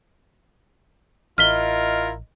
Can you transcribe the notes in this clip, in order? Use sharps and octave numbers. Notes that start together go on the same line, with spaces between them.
A1 E4 F4 A#4 D#5 F6 B6 G7